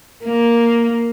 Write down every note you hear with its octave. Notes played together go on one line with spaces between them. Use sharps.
A#3